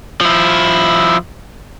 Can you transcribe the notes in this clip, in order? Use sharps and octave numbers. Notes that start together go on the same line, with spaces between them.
F3 E4